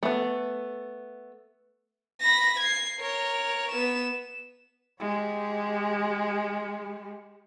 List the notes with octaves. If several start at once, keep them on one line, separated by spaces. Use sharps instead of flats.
A3 B3
B5 A#6
G#6 C7
A#4 C#5
B3 E7
G#3 G4